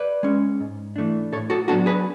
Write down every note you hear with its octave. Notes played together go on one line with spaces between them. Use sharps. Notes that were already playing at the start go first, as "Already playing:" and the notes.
Already playing: B4 D5
G#3 C#4
G#2
E3 A3 D4
A2 A4 C#5
F#4 A4
F#3 B3 D4 F#4 A4
G#4 B4